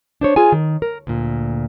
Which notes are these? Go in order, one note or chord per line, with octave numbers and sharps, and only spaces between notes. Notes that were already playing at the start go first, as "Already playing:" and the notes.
D4 C5 C#5
F4 G#4 G#5
D#3
A#4
D2 A#2